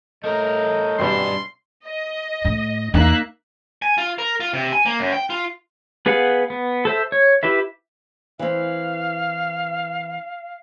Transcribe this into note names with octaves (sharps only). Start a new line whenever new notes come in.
A2 A3 A#4 D#5 A#5 G6
G#1 G2 B2 G3 D4 C6
D#5
A2
E2 A#3 D#4 E5 F#6
G#5
F4
A#4
F4
C3
G#5
A#3
F#2
G5
F4
B3 G#4 B4 F5 F#5
B3
A4 C5 E5
C#5
E4 G4 B4 E5
E3 C4 F5